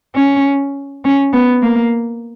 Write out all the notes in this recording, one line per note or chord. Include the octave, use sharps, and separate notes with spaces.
C#4
C#4
B3
A#3